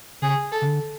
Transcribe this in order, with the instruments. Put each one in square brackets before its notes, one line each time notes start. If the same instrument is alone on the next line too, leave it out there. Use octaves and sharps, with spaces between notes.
[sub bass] C#3 [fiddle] G#4
[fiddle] A4
[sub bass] C#3
D3